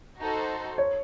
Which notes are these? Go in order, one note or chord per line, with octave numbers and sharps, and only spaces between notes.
D#4 F#4 A4 C5
C#5